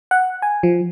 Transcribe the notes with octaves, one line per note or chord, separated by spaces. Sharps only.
F#5
G#5
F3